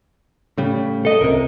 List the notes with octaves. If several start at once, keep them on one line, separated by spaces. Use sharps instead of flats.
A2 C#3 G3
A4 D#5
C#2 C3 A#4